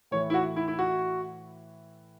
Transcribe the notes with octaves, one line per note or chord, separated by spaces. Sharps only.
A2 E3 C#5
E4
F#4
E4
E4
F#4